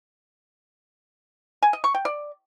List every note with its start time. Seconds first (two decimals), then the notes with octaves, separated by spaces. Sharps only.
1.63 G#5
1.73 D#5
1.84 C#6
1.94 G5
2.05 D5